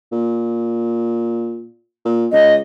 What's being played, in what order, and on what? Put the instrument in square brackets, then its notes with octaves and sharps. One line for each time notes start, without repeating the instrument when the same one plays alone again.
[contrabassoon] A#2
A#2
[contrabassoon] C#2 [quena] D#5